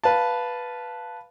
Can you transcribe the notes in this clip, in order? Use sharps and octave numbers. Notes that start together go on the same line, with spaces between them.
B4 F5 A5